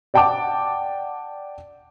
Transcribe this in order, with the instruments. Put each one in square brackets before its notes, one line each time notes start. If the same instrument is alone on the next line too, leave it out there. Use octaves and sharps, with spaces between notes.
[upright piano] D5 F#5 G5 A5 D6